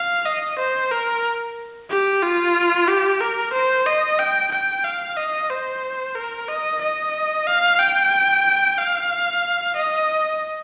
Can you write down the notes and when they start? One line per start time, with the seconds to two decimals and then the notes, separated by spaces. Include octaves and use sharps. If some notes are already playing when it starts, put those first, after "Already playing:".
Already playing: F5
0.25 D#5
0.58 C5
0.91 A#4
1.90 G4
2.22 F4
2.88 G4
3.20 A#4
3.53 C5
3.86 D#5
4.19 G5
4.51 G5
4.84 F5
5.17 D#5
5.50 C5
6.15 A#4
6.48 D#5
6.81 D#5
7.47 F5
7.79 G5
8.78 F5
9.76 D#5